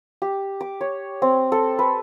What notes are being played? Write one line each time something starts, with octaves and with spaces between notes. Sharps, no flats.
G4
D6
C#5
C4
A4
B4